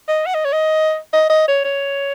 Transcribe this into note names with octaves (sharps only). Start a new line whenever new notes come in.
D#5
F#5
D#5
C#5
D#5
D#5
D#5
C#5
C#5